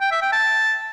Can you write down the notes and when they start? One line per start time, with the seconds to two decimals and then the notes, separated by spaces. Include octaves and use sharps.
0.01 G5
0.11 E5
0.22 G5
0.32 A5